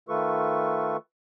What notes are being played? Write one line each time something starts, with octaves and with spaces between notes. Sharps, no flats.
D#3 A3 F4 A4 B4 C#6